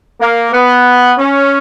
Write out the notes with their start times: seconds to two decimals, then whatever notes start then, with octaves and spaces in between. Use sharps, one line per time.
0.21 A#3
0.53 B3
1.19 C#4